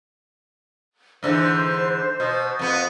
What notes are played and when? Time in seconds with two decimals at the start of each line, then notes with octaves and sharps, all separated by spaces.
1.23 G#2 D3 E3 C5
2.20 B2
2.59 F2 B3